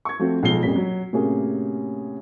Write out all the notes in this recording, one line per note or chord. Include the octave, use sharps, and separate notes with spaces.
C#6 G#6
F3 A3 C4 F4 F#4
B1 F3 G#3 C7 G7
F2 A#2 G3 C#4 B6
F#3
A2 C3 A#3 C#4 F#4 G#4